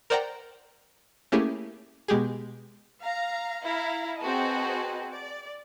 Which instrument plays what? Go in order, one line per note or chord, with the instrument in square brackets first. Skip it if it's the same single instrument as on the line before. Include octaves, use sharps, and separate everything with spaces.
[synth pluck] A#4 C5 D5 F#5 G5 A#5
A3 A#3 C#4 E4 G4 G#4
B2 G#3 G4 G#4
[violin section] F5 A#5
E4 F5 A#5
C4 F#4 G#4 B4 D#5 A5
D5